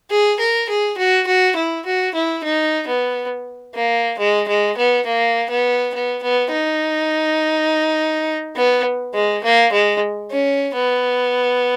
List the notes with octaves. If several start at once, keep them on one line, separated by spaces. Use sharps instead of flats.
G#4
A#4
G#4
F#4
F#4
E4
F#4
E4
D#4
B3
A#3
G#3
G#3
B3
A#3
B3
B3
B3
D#4
B3
G#3
A#3
G#3
C#4
B3